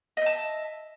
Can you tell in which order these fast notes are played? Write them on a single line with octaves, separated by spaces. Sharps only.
D#5 E5 A5